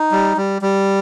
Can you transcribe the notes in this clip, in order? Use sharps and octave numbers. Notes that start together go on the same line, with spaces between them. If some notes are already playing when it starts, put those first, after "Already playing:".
Already playing: D#4
G3
G3
G3